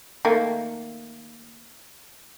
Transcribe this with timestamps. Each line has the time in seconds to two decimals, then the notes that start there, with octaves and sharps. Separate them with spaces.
0.25 D#3 A3 A#3